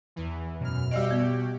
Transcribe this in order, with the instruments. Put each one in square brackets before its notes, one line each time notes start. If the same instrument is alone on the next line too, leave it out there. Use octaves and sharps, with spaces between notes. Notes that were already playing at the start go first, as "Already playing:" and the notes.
[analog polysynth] E2 E3
[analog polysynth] F#2 F6 [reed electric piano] B2
[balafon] G3 D5 D#5 [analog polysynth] F#4 G4
[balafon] B3